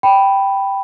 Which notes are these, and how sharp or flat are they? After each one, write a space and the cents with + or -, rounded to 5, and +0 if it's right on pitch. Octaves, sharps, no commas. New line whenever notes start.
G5 +0 B5 +0